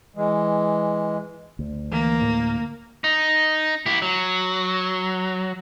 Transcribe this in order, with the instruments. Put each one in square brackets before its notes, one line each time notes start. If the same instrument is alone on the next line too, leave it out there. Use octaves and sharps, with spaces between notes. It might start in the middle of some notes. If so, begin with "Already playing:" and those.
[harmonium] E3 G#3
[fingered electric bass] D2
[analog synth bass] E3 [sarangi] A#3
[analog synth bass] A2
[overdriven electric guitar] D#4
E4 G4
F#3